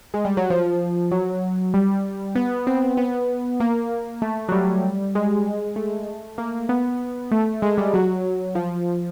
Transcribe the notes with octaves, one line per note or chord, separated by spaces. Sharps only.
G#3
G3
F#3
F3
F#3
G3
B3
C4
B3
A#3
A3
F#3
G3
G#3
A3
A#3
B3
A3
G#3
G3
F#3
F3